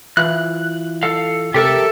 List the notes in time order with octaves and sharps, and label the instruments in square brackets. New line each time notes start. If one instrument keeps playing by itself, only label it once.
[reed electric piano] E3 E4 F4 [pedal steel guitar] F#6
[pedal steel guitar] A4 F5
[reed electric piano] C3 G5 [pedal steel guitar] G4 A#4 E5 [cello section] A4